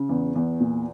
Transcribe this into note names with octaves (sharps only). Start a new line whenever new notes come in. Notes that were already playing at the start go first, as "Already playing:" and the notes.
Already playing: C#3
E2
E2
A#2